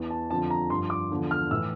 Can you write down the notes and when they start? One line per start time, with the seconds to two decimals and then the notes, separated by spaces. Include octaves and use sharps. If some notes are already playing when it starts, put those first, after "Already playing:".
Already playing: E2 E3
0.11 A5
0.30 F2 D3 F3 A5
0.51 A#5
0.70 G2 F3 C6
0.90 D6
1.11 E2 D3 F3
1.31 F6
1.51 A2 E3 E6